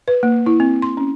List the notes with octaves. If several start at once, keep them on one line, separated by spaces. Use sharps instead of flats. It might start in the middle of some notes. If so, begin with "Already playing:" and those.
B4
A#3
E4
C4
C6
C#4